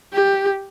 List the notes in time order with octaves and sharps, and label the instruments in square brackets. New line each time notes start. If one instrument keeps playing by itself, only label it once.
[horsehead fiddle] G4